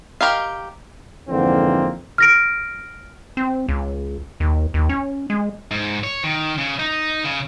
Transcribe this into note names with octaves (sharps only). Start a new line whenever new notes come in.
G4 A#4 D#5 F5
F2 G#2 D3 E3 A#3 C4
F6 A#6 D7
C4
C#2
D#2
D#2
C#4
G#3
G#2
C#5
D#3
C#3
D#4
C#3